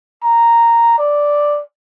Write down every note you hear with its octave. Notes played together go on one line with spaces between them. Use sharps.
A#5
D5